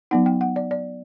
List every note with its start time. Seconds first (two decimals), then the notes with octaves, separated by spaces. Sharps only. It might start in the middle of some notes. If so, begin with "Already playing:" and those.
0.11 F#3 B3 D#4 F#5
0.26 G5
0.41 F#5
0.56 D5
0.71 D5